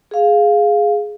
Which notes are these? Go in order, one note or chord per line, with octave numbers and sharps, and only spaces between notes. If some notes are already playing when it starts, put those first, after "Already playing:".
G#4 F5